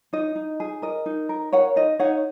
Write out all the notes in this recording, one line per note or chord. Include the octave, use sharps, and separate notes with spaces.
D#4 D#5
D#4
G#4
A#4 D#5
D#4
A#4
A#4 C#5 F#5
D#4 D#5
D#4 C#5 F#5